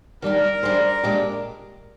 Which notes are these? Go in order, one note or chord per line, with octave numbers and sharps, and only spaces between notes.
D#3 G3 D4 G4 A#4
G3 D4 G#4 C5
A#2 G#3 D4 G4